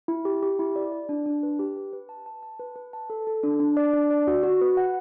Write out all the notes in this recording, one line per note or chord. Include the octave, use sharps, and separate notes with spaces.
E4
G4
G4
E4
D5
D5
D4
D4
B4
G4
B4
B4
A5
A5
A5
B4
B4
A5
A4
A4
D4
D4
D5
D4
D5
F#4
F#4
B4
F#5